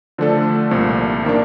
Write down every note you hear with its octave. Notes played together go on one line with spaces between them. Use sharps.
D3 F3 A3 D4 A4
C2 A#2 F3
D#3 A#3 D4